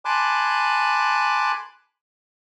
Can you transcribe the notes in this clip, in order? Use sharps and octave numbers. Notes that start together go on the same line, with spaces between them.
G#5 A5 B5 C6 D6 F#6